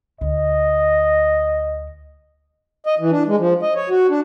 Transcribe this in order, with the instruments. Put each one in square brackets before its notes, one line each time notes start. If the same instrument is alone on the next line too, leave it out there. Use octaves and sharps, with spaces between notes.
[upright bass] D2 E4 [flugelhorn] D#5
[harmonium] D#5
E3
D4
G#3
F3
D#5
C#5
F#4
D4